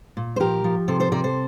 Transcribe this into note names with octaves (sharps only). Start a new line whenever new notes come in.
A#2
C5
F3 G4 A#4
F3
C3 A4 C5
A4 C5
C3 A#4 D5
A4 C5